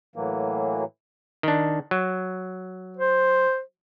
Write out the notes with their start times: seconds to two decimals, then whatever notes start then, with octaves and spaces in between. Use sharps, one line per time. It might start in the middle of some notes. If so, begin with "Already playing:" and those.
0.16 A2 E3 F#3 A#3
1.43 D#3 D4
1.91 F#3
2.97 C5